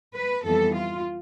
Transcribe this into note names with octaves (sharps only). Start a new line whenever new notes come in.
B4
F2 E3 G3 B3 A4
F4